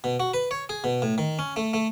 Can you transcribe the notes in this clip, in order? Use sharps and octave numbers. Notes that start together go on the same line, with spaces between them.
B2
F#4
B4
C#5
G#4
B2
A2
D#3
C#4
A3
A3